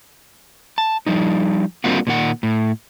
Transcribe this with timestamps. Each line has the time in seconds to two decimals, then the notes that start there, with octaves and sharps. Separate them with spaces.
0.78 A5
1.06 F3 G3 D#4
1.84 G3 A#3 C4 D4 F4 F#4
2.07 A#2 D#3 F#5
2.43 A2